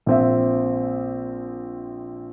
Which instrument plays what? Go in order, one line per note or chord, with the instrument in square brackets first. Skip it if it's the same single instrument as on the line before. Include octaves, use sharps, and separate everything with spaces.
[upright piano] A#1 C4 E5